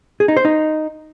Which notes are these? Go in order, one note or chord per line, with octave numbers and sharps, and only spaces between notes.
G#4
D#4
C5
D#4